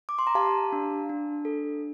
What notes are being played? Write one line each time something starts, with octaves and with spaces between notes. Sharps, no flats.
D6
C6
A#5
G4 F5 A5
D4
D4
A4